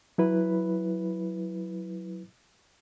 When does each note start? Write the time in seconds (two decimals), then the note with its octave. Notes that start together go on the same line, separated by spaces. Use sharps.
0.18 F#3 E4 B4